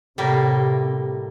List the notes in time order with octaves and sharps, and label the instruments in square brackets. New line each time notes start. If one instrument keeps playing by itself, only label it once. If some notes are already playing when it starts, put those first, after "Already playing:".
[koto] A2 G3 A#3 [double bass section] C3